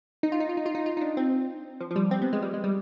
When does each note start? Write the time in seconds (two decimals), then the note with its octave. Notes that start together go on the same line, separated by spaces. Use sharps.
0.23 D#4
0.32 F4
0.40 D#4
0.49 F4
0.57 D#4
0.66 F4
0.75 D#4
0.86 F4
0.97 D#4
1.01 D4
1.17 C4
1.80 F3
1.91 F3
1.96 G3
2.11 C4
2.22 B3
2.33 G#3
2.42 G3
2.54 G#3
2.64 G3